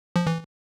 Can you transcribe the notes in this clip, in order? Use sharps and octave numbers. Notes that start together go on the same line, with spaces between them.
F3
E3